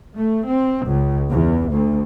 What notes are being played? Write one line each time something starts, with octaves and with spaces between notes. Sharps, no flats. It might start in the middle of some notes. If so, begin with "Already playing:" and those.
A3
C4
C#2
E2
D2